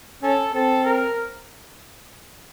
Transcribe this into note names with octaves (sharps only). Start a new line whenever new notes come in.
C#4 A4
C4 A4
A#4